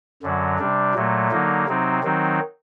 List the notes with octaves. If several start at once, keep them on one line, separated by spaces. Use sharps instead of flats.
F#2 D3 F#3
C3 G3 D4
A#2 F#3 A3
D3 F#3 A#3 D#4
C3 F#3 C4 D#4
D#3 F#3 C4 D#4